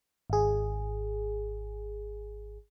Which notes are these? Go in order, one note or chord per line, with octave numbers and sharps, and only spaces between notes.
G#1 G#4